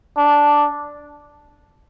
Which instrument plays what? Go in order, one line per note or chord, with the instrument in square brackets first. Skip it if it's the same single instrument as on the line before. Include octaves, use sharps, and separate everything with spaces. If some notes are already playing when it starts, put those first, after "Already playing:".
[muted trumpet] D4